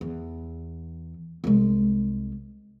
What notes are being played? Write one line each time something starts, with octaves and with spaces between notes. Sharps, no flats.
E2
C2 G#3